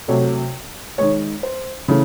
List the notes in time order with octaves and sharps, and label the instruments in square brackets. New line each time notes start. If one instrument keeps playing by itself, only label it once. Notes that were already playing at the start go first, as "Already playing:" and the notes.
[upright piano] C3 F#3 A3 C#5
D#3 G#3 C#5
C5
C#3 E3 A3